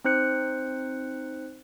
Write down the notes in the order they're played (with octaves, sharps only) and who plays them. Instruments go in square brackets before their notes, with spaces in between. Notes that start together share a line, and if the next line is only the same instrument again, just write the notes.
[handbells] C4 D#4 C5 F#6 C#7